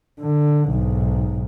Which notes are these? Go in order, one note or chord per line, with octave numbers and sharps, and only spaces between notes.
D3
B1 G#2